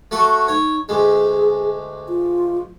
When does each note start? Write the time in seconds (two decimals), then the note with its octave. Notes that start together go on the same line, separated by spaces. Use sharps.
0.11 A3 F#4 F#5
0.48 D#4 C#5
0.89 D2 G#3 G#4
2.09 F4